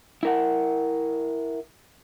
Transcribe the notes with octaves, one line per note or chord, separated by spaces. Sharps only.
E4 A#4 F#5